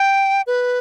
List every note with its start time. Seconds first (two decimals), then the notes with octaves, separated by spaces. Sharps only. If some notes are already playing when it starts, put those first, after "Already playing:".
Already playing: G5
0.47 B4